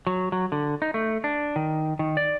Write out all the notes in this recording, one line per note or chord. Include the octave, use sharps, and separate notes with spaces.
F#3
F#3
D3
D#4
A3
D4
D#3
D#3
D5